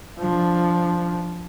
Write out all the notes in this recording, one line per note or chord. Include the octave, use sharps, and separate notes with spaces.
F3 D4